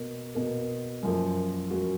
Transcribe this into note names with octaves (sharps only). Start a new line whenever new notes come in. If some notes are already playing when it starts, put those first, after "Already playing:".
Already playing: B2 A#3
B2 A#3
F#2 F3 A#3
F#2 F3 A#3 F#4